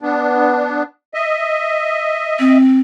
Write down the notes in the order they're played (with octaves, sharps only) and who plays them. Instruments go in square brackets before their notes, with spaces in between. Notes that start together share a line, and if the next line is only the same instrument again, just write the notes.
[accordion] B3 D4
D#5 E5
[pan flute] C4